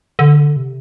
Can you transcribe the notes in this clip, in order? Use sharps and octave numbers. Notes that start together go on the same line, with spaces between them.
D3
C3